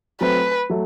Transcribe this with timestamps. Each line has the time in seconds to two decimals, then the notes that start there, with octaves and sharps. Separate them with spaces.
0.21 F#3 A3 C4 B4
0.70 F#3 A3